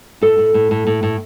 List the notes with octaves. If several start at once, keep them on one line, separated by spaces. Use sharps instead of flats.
A2 A4
A2
A2
A2
A2
A2